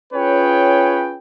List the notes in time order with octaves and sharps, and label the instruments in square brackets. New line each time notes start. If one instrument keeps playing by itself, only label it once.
[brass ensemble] C#4 F4 G#4 B4 C#5 G5